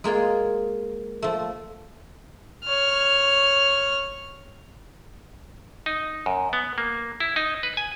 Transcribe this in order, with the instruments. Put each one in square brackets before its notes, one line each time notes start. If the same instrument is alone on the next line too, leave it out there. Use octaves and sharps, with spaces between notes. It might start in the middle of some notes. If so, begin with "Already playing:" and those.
[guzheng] G#3 A#3 F4 G#4
F3 A3
[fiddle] C#5 F6
[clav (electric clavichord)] D#4
F#2
B3
A#3
E4
D#4
B4
G#5